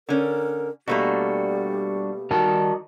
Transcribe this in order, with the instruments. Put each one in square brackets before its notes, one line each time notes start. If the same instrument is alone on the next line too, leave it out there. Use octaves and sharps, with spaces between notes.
[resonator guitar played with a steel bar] D3 C#4 [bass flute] A#4
[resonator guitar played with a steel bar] B2 A3 A#3 [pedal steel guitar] G3 D4 F#4 [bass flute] G4
[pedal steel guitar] D#3 G3 D#4 [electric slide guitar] F#4 A#4 A5